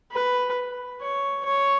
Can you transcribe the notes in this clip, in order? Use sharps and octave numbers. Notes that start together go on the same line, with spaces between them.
B4
C#5
C#5